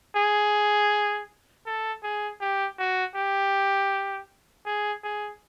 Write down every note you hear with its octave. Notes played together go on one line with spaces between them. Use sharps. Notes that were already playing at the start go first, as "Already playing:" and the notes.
G#4
A4
G#4
G4
F#4
G4
G#4
G#4